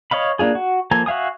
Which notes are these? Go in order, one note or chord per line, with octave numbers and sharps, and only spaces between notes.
C#5 D#5 F5 B5
A#3 D4 F4 G#4
F#4
F3 A#3 A4 G#5 A#5
F#4 E5 F5 G#5 D#6